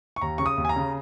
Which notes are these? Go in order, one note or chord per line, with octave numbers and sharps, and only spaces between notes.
C#6
D#2 A#5
C#3 C#6
D#6
D#2
G#5
A#5
C#3